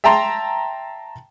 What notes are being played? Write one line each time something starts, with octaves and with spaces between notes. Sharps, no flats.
E5 G5 A5 A#5 C6